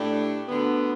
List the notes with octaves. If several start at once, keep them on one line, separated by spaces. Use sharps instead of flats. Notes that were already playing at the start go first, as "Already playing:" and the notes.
Already playing: A2 A3 D4 G4
D2 D3 B3